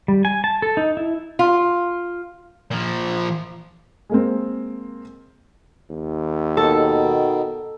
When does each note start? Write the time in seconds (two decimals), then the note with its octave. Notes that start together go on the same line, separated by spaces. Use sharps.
0.08 G3
0.25 G#5
0.44 A5
0.62 A4
0.77 D#4
0.97 E4
1.39 F4
2.71 A#2 F3
4.10 G#3 A#3 C4
5.90 D#2
6.57 B2 D#3 A4